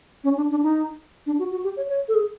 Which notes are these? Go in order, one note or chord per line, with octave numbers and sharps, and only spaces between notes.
C#4
D4
D4
D#4
D4
F#4
F#4
G4
C#5
C#5
A4
G#4